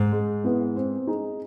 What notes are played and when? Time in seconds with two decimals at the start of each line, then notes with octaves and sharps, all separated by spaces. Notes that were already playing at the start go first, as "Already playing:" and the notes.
Already playing: G#2
0.12 G#3
0.44 B3 E4 G#4 B4
0.76 C4
1.07 D#4 G#4